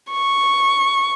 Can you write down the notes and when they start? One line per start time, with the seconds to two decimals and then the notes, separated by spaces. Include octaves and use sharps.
0.11 C#6